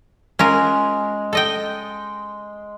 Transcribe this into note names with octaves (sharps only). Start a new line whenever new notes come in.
G#3 C#4 F4 A#4
A4 D#5 G5